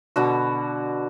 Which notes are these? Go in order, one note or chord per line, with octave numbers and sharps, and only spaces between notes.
B2 D3 F#4